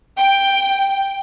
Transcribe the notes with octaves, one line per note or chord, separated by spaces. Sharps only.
G5